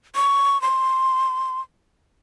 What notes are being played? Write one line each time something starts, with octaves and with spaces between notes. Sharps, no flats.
C#6
C6